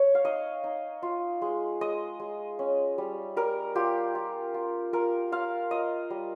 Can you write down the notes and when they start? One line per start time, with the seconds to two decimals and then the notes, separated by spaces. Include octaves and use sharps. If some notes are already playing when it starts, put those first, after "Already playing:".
Already playing: C#5
0.15 F5
0.25 D#4 D#5
0.64 D#4
1.03 F4
1.42 G#3
1.81 G#3 D#5
2.20 G#3
2.59 C#4
2.98 G3
3.37 G3 A#4
3.75 F4 G4
4.15 F4
4.54 F4
4.93 F4 A#4
5.32 F4 F5
5.71 F4 D#5
6.10 G3